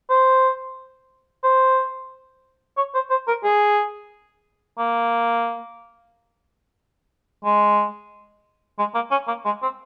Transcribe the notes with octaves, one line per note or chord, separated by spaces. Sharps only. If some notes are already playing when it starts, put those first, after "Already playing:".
C5
C5
C#5
C5
C5
A#4
G#4
A#3
G#3
G#3
A#3
C#4
A#3
G#3
C4